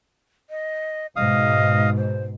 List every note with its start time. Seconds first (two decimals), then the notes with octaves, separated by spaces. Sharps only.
0.50 D#5
1.16 G#2 B2 D#5 F5 D#6
1.97 C5